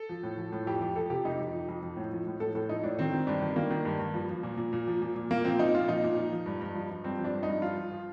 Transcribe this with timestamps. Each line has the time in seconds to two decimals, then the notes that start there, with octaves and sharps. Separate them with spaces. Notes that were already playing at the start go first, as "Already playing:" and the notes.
Already playing: A4
0.09 F3
0.23 A2
0.38 F3
0.52 A2
0.67 F2 G4
0.81 F3 G4
0.95 F3 A4
1.10 C3 G4
1.25 F2 D#4
1.40 F2
1.54 F3
1.68 F2
1.83 F3
1.97 A2
2.12 F3
2.27 A2
2.40 A2 A4
2.55 A2 A4
2.69 F3 D#4
2.83 A2 D4
2.99 D#3 C4
3.13 D#3
3.27 G2 D4
3.42 D#3
3.56 D#3 A#3
3.71 D#3
3.85 G2
3.99 G2
4.14 F3
4.29 F3
4.43 A#2
4.57 A#2
4.73 A#2
4.88 F3
5.02 A#2
5.15 A#2
5.31 A#2 A#3
5.45 F3 C4
5.59 A#2 D#4
5.74 A#2 F4
5.88 F3 D#4
6.03 A#2
6.17 F3
6.32 F3
6.46 G2
6.61 G2
6.75 F3
6.90 F3
7.04 G2 C4
7.19 F3
7.24 D4
7.33 G2
7.43 D#4
7.48 G2
7.62 F3 F4
7.76 F3
7.92 F3